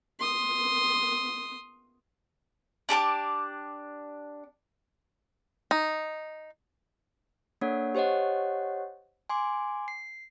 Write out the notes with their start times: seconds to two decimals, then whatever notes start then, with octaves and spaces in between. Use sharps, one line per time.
0.20 C6 D#6
2.89 D4 G4 A5 D6
5.71 D#4
7.61 A#3 D4 A4 C#5 F#5
7.95 G4 C5 C#5 D#5 F#5
9.30 G#5 C6 D6
9.88 C7